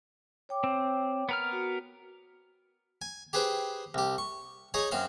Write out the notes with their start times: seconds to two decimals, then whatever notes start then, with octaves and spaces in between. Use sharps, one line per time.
0.49 C#5 G5 D6
0.64 C4
1.29 B3 A#4 F6
1.52 F#4
3.02 G#5
3.33 G4 G#4 B4 C5 G5
3.94 C2 G4
4.18 C#6
4.74 D#4 G#4 C#5 G#5
4.91 F#2 C4 F5 C6